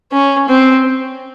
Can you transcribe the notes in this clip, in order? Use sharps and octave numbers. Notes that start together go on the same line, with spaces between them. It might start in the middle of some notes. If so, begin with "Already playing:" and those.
C#4
C4